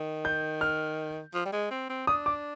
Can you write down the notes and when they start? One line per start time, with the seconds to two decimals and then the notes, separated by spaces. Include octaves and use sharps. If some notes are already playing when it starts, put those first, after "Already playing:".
Already playing: D#3
0.25 G6
0.61 F6
1.34 F3
1.46 G3
1.53 G#3
1.71 C4
1.90 C4
2.07 D4 D#6
2.26 D6